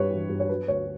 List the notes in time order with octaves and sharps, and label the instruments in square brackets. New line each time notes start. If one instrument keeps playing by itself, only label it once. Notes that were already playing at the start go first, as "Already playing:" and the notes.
Already playing: [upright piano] G2 G3 B4 C#5
E3
G2
C#5
F#3 B4
D2 C#5